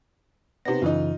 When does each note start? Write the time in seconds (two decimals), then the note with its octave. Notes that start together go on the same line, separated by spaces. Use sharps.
0.65 C3 B3 D#4 A#6
0.82 F#2 C#3 E3 D#4 F4